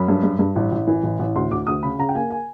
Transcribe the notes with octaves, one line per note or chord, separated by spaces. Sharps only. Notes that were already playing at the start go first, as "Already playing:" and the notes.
Already playing: F#2 B5
G2
G2
G2
A1
A1
E3
A1
A1
D2 C6
D2 D6
D2 D#6
C#3 B5
C#3 A#5
G5
A#3 G#5
G#5